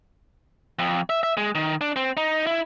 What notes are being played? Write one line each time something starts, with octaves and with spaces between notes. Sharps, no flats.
F2
E5
E5
G#3
D#3
D4
C4
D#4
E4